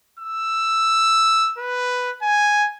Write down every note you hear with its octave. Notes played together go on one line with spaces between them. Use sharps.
E6
B4
G#5